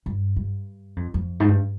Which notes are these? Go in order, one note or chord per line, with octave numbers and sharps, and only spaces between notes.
G2
G2
F2
F2
G#2
G2